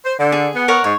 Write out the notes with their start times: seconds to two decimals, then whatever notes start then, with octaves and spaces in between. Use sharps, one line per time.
0.04 C5
0.19 D3
0.32 G#4
0.55 B3
0.68 A#4 C#5 F#5
0.84 G#2 C#5